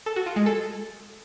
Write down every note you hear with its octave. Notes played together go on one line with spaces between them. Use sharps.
A4
F#4
F4
G#3
A4